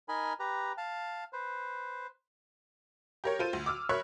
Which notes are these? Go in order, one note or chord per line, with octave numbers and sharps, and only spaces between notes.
D#4 A#4 D#5 G#5 B5
G4 B4 A#5
F5 A5
B4 C5
G4 A#4 C#5
F4 A4 C5 D#7
D2
D6 E6 F6
A#4 C#5 E5 B5 C#6 F#6